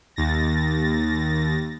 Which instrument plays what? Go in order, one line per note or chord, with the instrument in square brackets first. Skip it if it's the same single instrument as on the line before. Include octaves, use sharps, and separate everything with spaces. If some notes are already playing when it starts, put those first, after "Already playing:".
[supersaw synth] D#2 A6 A#6